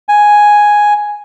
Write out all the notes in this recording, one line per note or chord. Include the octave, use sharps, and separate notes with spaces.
G#5